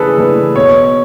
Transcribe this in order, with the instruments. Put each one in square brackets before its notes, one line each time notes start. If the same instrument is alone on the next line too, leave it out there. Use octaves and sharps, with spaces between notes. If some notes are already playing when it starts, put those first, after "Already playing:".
Already playing: [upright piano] C#3 E3 A3 D4 [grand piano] G#4 A4 B4
[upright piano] E3 A3 D4
[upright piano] B2 [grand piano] C#5